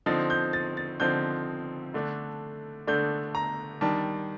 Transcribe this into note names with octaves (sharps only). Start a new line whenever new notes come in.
D3 F3 C4 D#4 A6
G6
A6
A6
D3 F3 C4 D#4 G6
D3 A3 D4
D3 A3 D4 G6
A#5
D#3 G3 D4 A5